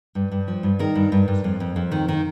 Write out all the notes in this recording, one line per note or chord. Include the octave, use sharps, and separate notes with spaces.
G2
G2
F3
G2
D#3 A#4
G2
G2
G2
F2
F2
F2
D#3
D#3